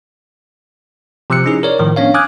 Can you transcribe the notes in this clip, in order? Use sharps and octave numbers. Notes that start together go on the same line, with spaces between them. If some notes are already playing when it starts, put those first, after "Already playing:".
C3 F3 E6 F#6 C#7
C#4 D#4 E4 G#4
A#4 C#5 D5
A2 D#3 F3
B3 C#4 D4 C#5 F5
G#5 D6 D#6 F6 F#6 G#6